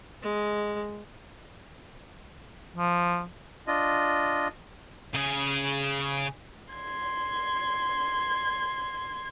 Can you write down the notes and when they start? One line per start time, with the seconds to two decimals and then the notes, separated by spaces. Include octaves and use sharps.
0.23 G#3
2.76 F3
3.67 D4 F4 D#5
5.14 C#3 G#4
6.73 C6 G#6